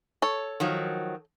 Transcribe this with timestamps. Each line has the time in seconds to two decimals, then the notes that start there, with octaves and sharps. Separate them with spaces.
0.22 A4 C#5
0.60 D#3 F3 F#3